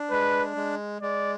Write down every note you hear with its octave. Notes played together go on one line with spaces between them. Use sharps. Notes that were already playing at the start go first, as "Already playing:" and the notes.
Already playing: D4
G#3 B4
G#3
G#3 D5